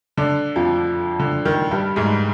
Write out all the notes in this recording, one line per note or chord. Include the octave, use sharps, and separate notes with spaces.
D3 D4
F2 F3
D3
D#3
G2 G3
G#2 G#3